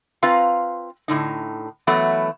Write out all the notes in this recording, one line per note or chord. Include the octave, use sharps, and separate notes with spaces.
C4 F4 B4 F5 A#5
A2 D3 D#4
E3 F#3 A3 B3 F#4